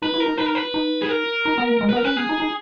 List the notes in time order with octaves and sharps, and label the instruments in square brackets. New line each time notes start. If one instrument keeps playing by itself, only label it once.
[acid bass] D#4 [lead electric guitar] B4
[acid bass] E4
[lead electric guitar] A#4
[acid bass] D#4
[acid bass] D#4 [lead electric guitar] B4
[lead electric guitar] A#4
B4
[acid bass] D#4
[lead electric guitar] G#4
A#4
[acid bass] D#4
B3
A#3
G#3
[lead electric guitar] B4
[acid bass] B3
[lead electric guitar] A#4
[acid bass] C#4 [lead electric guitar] B4
[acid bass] B3 [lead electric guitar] G#4
[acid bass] D#4
D#4